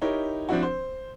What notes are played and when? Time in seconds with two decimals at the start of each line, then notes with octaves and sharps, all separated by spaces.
0.02 D#4 E4 G4 A#4 C#5
0.49 F3 C4 D4 E4 F#4
0.63 C5